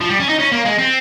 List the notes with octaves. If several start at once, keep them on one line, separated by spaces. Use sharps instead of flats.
F3
G3
C#4
D#4
C#4
A#3
G#3
C4